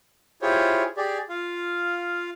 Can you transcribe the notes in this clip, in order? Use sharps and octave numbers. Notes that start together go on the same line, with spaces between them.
E4 F4 G4 G#4 C5 C#5
G4 G#4 D5
F4 F5